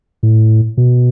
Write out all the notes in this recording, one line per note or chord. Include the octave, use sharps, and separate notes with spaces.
A2
B2